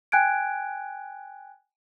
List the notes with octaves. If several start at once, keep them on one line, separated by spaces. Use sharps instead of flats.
G5 G#5 F#6 G#6 D7